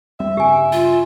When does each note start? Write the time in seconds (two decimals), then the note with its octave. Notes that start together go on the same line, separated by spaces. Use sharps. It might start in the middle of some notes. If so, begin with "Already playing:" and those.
0.20 F2 G3 C4 E5
0.37 G2 C#3 G4 G#5
0.72 F4